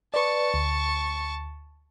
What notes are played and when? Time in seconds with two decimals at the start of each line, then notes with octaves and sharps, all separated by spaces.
0.14 B4 D5 A5 C#6
0.54 D2